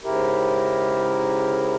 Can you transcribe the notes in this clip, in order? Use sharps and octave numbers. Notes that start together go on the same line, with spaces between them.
G#2 C#3 E4 G4 A#4